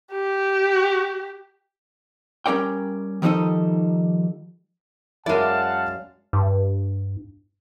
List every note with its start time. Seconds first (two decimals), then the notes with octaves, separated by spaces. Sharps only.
0.13 G4
2.46 G3 C#4 A#4 D5 G5
3.22 D#3 F3 G3 D#4 A4 D#5
5.26 F#2 G#3 E4 A#4 D5 F5 F#5 A5
6.33 G2